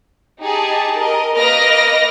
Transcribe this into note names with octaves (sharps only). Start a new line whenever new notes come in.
D#4 G4 G#4 A5
A#4 D#5
A#3 B4 D#5 F6 A#6 D7